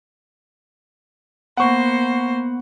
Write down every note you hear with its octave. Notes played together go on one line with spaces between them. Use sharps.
A#3 B3 C5 F#5 C#6